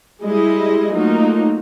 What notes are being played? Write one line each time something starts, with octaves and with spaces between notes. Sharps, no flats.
G3 G#3 E4 D#5
F#3 A3 A#3 D#4 F4 F#4